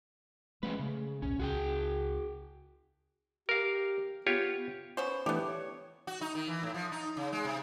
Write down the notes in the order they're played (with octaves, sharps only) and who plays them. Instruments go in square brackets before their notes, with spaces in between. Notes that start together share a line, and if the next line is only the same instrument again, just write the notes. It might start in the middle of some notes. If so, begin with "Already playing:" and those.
[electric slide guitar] F3 C#4 B4 [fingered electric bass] G#3 A3
[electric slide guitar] C#3 [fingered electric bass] A3
[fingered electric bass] A#1 D#2 G#2 [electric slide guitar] C#4
[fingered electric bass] C#2 C#3 [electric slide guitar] F#4 G#4 G5
[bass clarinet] G4 [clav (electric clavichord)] A#4 F5
[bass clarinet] B3 [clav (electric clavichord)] F4 G4 C#5
[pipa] B3 C#4 C5
[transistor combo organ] E3 A3 D4 [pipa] B3 G4
[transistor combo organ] C#5
[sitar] F#4
D#4
D#3
E3
A2
F3
D#4
C#3
G#3
C3